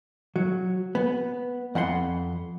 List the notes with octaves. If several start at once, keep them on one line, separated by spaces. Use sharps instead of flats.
F#3
B3
F2 F#5 B5 C6